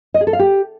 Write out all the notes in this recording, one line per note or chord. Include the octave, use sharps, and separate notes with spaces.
D#5
G#4
A4
F5
G4